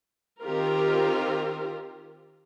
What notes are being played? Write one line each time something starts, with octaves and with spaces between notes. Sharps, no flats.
D#3 C4 F4 G4 A#4